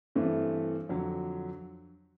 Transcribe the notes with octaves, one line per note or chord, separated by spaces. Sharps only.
G2 E3 A3 C4
F2 D3 F#3